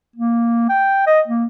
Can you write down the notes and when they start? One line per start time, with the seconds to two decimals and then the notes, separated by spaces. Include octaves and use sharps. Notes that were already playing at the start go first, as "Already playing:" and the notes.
0.16 A#3
0.69 G5
1.07 D#5
1.28 A#3